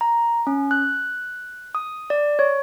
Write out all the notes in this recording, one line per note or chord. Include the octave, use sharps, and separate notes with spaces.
A#5
C#4
F#6
D#6
D5
C#5